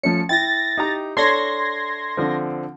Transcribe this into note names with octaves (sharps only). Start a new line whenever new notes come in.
F3 A3 C#4 C#7
E4 G5 A6 A#6
D#4 G4 A#5
D4 A4 C#5 C6 G#6 A#6
D3 F3 C4